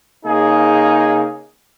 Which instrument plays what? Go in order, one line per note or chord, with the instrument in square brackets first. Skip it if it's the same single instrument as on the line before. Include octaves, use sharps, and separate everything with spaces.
[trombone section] C#3 A#3 D#4 G#4